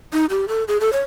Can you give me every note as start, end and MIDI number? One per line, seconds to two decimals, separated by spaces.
0.13 0.26 63
0.30 0.45 67
0.48 0.64 69
0.68 0.78 68
0.81 0.92 69
0.93 1.01 73